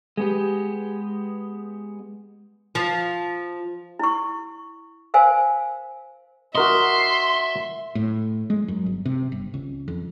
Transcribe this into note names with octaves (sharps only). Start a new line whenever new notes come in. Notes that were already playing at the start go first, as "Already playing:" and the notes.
G#3 B3 G4
F3
E4 C#6
A#4 C5 F5 G#5
F#4 A#4 D#5 E5 C6
A2
G#3
F#2
G1
C3
G1
C#2
F2